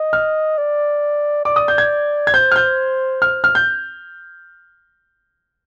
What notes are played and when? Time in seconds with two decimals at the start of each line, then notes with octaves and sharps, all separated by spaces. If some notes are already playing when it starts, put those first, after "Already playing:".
Already playing: D#5
0.13 F6
0.58 D5
1.45 D5 D6
1.56 D#6
1.68 G6
1.78 G#6
2.27 G#6
2.34 C5 G6
2.51 F6
2.56 G6
3.22 F6
3.44 F6
3.55 G6